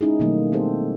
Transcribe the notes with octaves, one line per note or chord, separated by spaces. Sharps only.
G#3 C#4 D#4 E4 G#4
B2 D#3 F#3 G3 A3 A#3
C4 G4 A4 C5